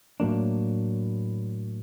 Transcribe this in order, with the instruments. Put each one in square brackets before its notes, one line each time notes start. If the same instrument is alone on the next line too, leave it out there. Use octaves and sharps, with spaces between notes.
[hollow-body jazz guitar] A2 F#3 A#3 D4